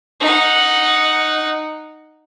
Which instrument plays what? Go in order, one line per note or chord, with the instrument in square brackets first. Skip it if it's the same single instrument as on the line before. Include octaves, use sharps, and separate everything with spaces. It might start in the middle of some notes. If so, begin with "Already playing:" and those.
[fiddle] D#4 F#5